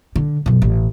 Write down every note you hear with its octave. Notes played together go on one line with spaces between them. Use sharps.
D3
F#2 B2
A1